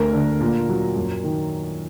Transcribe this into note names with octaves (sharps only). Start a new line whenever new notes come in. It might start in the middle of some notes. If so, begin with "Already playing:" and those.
Already playing: D2 D3 A#4
D3
A#2
F#3
F#2
D#3